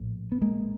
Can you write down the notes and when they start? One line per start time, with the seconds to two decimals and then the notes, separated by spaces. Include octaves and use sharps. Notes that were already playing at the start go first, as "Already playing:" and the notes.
Already playing: A#1 A2
0.32 B3
0.42 G#3 A#3